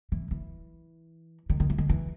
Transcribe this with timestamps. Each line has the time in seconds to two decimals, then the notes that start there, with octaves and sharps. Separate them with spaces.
0.12 E3
0.31 E3
1.50 D#3
1.60 D#3
1.70 E3
1.78 D#3
1.89 E3